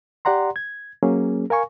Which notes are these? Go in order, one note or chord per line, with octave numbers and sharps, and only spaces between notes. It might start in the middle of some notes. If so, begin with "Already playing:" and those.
G4 D5 F#5 A#5 C6
G#6
F#3 A#3 C#4 G#4
A#4 F5 G#5 C#6